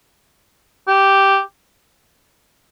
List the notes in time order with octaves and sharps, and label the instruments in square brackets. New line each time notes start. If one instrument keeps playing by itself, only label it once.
[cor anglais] G4